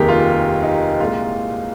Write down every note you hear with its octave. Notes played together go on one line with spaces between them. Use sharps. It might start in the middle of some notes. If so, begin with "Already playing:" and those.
Already playing: F1 D#2 D#3 G3 A#3 G4 G#4 A#4
F4
D#4
C2 A#2 G#3 F4